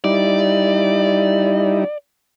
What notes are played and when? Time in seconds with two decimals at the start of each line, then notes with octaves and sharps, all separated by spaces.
0.04 G3 D#4 E4 D5